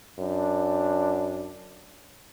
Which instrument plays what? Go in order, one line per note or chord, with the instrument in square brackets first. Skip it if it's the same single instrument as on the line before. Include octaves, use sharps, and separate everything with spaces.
[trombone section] F#2 D4